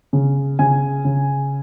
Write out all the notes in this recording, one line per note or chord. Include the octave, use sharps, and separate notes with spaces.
C#3
C#3 G#5
C#3